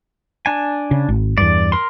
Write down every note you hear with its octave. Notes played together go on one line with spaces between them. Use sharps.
D4 G#5
C#3
G#1
E2 G2 D5
A#4 C6